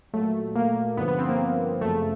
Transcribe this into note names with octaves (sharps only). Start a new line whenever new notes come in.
A#2 F#3 A3
A#3
G2 D3 F3 B3
B3
C4
A#3
F#2 C#3 F3 A3